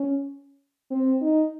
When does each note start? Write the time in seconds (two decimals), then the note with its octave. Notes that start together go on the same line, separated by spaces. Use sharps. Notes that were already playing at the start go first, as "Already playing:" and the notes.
Already playing: C#4
0.91 C4
1.22 D#4